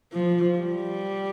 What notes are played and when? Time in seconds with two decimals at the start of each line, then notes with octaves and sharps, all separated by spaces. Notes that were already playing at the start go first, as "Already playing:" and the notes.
0.13 F3
0.59 G3